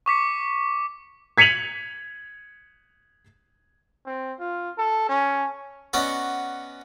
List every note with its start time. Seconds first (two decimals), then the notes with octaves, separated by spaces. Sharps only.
0.06 C#6 D6 B6 C#7
1.38 G#6 B6 C#7 D#7 F7 F#7
4.06 C4
4.40 F4
4.78 A4
5.09 C#4
5.93 B3 C#4 F#4 D5 D#5 D#6